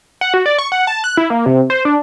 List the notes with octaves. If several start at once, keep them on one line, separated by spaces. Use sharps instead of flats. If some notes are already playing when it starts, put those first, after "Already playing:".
F#5
F#4
D5
C#6
F#5
A5
F#6
E4
A#3
C3
C5
D4